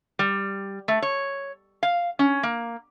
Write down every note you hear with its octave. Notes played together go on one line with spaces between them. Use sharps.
G3
A3
C#5
F5
C#4
A#3